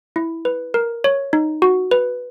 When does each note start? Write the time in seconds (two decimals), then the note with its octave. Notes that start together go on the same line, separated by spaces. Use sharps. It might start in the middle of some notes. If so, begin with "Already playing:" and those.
0.16 E4
0.45 B4
0.74 A#4
1.04 C#5
1.33 D#4
1.62 F#4
1.91 B4